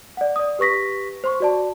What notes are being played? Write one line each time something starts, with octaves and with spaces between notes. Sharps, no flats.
D5 F#5
D5 D#6
G4 B4 C#6 A#6 B6
C5 C6 C#6
F#4 D5 A5